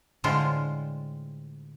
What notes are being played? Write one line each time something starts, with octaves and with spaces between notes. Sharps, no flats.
A2 D3 G#3 F4 C5 G5